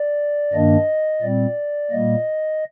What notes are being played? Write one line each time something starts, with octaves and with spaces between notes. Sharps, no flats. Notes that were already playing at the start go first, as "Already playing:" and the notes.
Already playing: D5
G2 D#3 A#3 D4 D#5
A#2 G3 C4 D5
A#2 G3 A#3 D#5